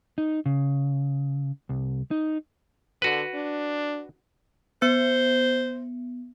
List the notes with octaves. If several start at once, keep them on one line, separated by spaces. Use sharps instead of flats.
D#4
C#3
C2
D#4
D3 F#4 B4
D4
B3 C5 C#7